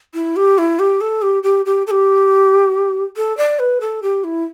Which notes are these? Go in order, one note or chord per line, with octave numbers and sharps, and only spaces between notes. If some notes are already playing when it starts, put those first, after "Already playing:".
E4
G4
E4
G4
A4
G4
G4
G4
A4
G4
A4
D5
B4
A4
G4
E4